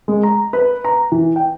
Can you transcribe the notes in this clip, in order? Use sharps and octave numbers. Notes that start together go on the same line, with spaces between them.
G#3
A#5
B4
A#5
E3
G5